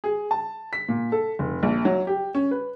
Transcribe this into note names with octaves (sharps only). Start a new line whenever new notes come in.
G#4
A5
B6
A#2
A4
F1
A#1
F#3
G4
C#4
B4